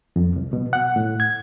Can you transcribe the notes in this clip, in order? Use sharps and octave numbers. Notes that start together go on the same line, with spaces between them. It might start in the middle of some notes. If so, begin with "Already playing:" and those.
F2
C2
B2
F#5
A2
G#6